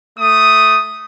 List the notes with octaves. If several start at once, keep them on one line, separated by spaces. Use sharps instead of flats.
A3 D#6